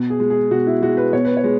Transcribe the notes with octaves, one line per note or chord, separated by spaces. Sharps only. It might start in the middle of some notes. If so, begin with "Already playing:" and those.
Already playing: B2
G#4
G#3
G#4
B2 F#4
E4
G#3 F#4
B4
B2 C#5
B4
C#5
G#3